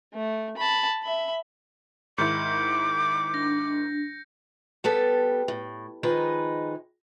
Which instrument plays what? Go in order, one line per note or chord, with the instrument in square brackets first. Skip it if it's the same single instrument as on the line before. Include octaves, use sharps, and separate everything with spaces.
[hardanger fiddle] A3
A5 B5
E5 B5
[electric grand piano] G#2 D#3 E4 [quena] D6 [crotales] G6 C#7
[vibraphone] D4 [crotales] A#6
[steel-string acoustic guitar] G3 B3 G4 A4
A2
D#3 F3 G#3 D#4 G#4 B4